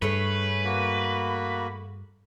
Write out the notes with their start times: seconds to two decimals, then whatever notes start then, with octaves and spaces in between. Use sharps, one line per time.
0.02 G2 A3 G#4 B4 C#5
0.65 A#3 F#4